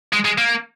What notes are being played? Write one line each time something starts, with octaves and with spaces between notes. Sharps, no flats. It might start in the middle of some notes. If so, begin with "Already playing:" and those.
G#3
G#3
A#3